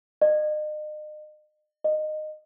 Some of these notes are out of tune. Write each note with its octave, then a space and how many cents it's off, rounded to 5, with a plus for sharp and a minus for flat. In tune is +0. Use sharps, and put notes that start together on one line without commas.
D#5 -40
D#5 -20